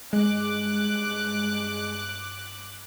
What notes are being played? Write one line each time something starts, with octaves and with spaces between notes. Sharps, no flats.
G2 G#3 D6 F#6